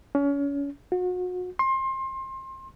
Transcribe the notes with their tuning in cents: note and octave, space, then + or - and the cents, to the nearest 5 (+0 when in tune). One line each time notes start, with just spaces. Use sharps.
C#4 +30
F#4 -35
C6 +25